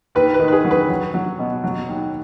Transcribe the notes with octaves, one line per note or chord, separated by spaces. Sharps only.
D#2 B4
B4
D#3
B4
G#4
F#3
B4
F#3
F#3
B2
F#3
D#2